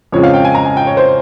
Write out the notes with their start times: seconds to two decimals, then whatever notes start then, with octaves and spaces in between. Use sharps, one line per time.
0.12 F2 C#3 F3 G#3 C#5
0.23 F5
0.33 G5
0.45 G#5
0.55 A#5
0.65 G#5
0.77 G5
0.87 C#5
0.97 C5